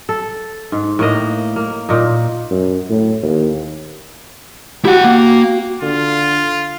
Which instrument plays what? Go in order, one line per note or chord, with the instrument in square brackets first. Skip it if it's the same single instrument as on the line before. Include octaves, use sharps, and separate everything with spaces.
[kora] A4
G#2
A2 A#3 D#5
A#3
A#2 D#4
[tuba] F#2
A2
D#2
[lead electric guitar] E4 F#5 [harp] F#4 G4
[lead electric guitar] A#3
[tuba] D3 [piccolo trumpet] F4